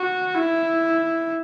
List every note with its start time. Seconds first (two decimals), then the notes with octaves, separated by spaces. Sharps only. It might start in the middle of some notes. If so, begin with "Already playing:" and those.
Already playing: F#4
0.35 E4